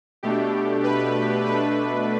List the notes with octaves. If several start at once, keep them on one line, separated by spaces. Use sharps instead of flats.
B2 A3 D4 G4
B4
B2 A3 D4 B4